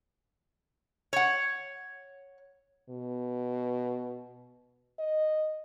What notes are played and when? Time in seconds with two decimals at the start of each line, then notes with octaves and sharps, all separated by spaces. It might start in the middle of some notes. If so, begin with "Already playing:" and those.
1.13 C#5 F#5
2.90 B2
4.99 D#5